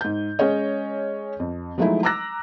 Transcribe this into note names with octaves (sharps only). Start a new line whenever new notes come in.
G#2 G6
G#3 C#4 G#4 C#5 D#5
F2
F3 F#3 G#3 A3 D#4 E4
A#5 D6 E6 F#6 A#6